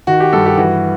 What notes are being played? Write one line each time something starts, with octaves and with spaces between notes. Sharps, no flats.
D#3 F#4
G4
G2 A4
G4
E3 F#4